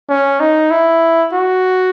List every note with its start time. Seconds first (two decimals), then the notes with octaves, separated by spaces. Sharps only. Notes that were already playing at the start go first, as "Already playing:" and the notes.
0.09 C#4
0.40 D#4
0.71 E4
1.33 F#4